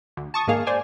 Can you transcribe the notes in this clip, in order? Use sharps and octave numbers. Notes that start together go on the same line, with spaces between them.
D2
A5 C#6 D#6
G#2 D#3 A#3 G#4 F5
C5 D5 G#5